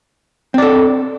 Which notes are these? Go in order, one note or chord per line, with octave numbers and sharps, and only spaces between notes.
C4 A4 D5